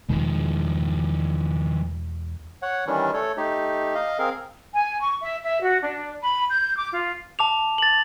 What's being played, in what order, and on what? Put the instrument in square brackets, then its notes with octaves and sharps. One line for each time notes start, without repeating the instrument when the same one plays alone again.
[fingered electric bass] E2 B2 G#3 [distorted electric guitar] D#3 F3
[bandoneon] C#5 F#5
D#3 E3 G3 C#4 D4
A3 A4 C#5
A3 D#4 G4
D#5 F5
C4 G#4 A#4 F5
[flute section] G#5
C#6
E5
E5
F#4
D4
B5
G6
D6
F4
[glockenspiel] A5 D6 F7
A6 F#7